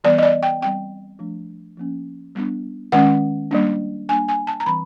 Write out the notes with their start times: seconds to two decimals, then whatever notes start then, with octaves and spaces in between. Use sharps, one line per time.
0.04 E3 G3 B3 D5
0.18 D#5
0.23 D5
0.43 G5
0.61 G3 C4 G5
1.19 F3 A3 D4
1.77 F3 A#3 C#4
2.35 G3 B3 D4
2.92 D#3 G#3 C#4 F#5
3.51 G3 A#3 D4
4.09 G3 A#3 D4 G#5
4.28 G#5
4.47 A5
4.60 A#5
4.66 E3 G3 C4 B5